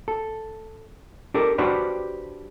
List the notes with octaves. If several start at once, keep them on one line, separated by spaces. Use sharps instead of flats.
A4
D4 G4 A4 A#4
D4 F#4 G4 B4 C5 D5